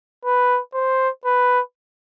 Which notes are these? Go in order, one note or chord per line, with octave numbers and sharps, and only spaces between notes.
B4
C5
B4